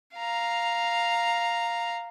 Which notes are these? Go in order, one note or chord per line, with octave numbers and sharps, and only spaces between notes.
F5 A#5